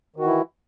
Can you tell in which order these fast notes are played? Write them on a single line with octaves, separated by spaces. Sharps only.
D#3 F#4 E3 E4